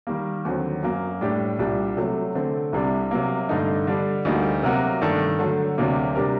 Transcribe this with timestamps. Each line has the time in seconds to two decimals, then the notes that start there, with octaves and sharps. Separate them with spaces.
0.07 D#3 G3 A#3
0.45 D#2 D3 F#3 C4
0.83 F#2 F#3 A#3
1.21 A2 G3 D4 G4
1.59 C2 A#2 G3 D4 G4
1.97 C3 F#3 A3
2.35 D3 A3 C4
2.73 C2 C3 G3 D4
3.11 C3 F#3 A#3
3.49 G2 D3 A3 D#4
3.87 D3 G3 D4
4.25 D2 D3 G3 A#3 D#4
4.63 C3 F#3 A#3 F#4 A#4
5.01 G2 D#3 A3 D4 A4
5.39 D3 F#3 A3
5.78 D2 C3 F#3 A#3 D4
6.16 C3 G3 D4 G4 A#4